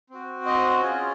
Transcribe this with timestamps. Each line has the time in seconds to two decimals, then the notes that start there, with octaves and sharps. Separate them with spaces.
0.10 C4 F#4
0.46 D#5
0.80 C#4 F4 G#4